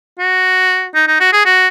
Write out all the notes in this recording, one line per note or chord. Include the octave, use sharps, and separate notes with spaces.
F#4
D#4
D#4
F#4
G#4
F#4